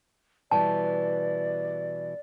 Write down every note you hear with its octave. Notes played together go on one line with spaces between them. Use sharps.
B2 E3 G3 D5 A5